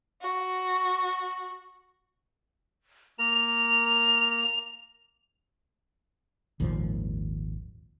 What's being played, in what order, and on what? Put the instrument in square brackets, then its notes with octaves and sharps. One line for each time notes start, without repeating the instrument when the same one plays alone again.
[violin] F#4
[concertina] A#3 A#4 A#5 [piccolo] F7
[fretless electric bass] G#1 D#2 A#2 F3